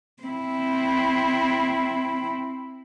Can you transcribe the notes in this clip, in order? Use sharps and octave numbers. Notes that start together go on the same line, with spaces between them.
C4 E4